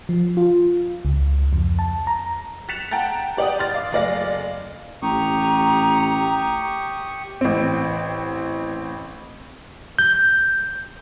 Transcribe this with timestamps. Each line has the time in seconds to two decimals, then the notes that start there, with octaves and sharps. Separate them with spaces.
0.09 F3
0.37 F4
1.05 C#2
1.53 F2
1.79 A5
2.07 A#5
2.69 F#6 A6 B6 C#7 E7 F7
2.91 F#5 G5 A5 A#5 A6
3.37 G4 D5 F#5 G5 D#6
3.59 C6 F6 A6
3.74 F5 D6
3.92 F#1 A3 D5 F5 A#6
5.02 A1 G4 A#5 C#6 D#6
7.41 A1 C4
9.99 G6